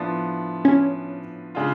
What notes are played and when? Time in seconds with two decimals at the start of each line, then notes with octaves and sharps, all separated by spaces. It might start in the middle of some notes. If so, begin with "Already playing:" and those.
Already playing: A2 F3 B3 D4
0.65 C#4
1.55 C#3 G#3 D4 F4